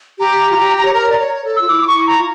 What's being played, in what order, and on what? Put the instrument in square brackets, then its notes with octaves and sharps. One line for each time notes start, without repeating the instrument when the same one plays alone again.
[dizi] G4 [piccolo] A#5
[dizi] F4
G4
C#5
A#4
D5
C#5
A4
[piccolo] E6
[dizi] F4
[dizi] E4 [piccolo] D6
[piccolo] D6
C#6
[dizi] E4
[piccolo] A#5
[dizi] F4